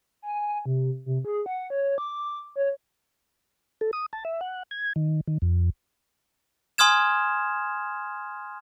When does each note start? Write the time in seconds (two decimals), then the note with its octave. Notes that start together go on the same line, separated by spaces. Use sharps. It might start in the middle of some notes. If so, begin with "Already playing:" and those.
0.22 G#5
0.66 C3
1.06 C3
1.25 G#4
1.46 F#5
1.70 C#5
1.98 D6
2.56 C#5
3.81 A4
3.93 D#6
4.13 A5
4.25 E5
4.41 F#5
4.71 G#6
4.96 D#3
5.28 D#3
5.42 F2
6.78 G#5 C6 D#6 F6 G#6 E7